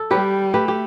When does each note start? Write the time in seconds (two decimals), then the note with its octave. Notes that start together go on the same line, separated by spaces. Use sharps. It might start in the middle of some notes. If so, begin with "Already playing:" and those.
Already playing: A4
0.11 G3 G4 B4
0.53 A3 G4 B4
0.68 G4